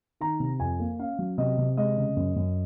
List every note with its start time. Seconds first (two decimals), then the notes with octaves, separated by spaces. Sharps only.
0.21 D#3 A#5
0.40 C3
0.59 F2 G#5
0.80 A#3
0.99 C#4 F5
1.19 F#3
1.38 C3 D#5
1.58 C3
1.77 G#3 D#5
1.97 C#3
2.16 F#2
2.36 F#2